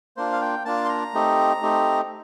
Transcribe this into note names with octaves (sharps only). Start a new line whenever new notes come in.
A#3 D4 F4 C5
F5
G5
A#3 D4 F4 A5
C6
A#5
A3 C4 D#4 G4
A3 C4 D#4 G4